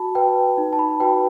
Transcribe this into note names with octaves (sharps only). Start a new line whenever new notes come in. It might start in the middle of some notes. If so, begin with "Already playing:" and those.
Already playing: F#4 A5 B5
B4 G5
D#4
A5
B5
F#4 B4 G5